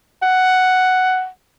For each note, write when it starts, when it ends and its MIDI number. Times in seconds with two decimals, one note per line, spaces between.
0.22 1.28 78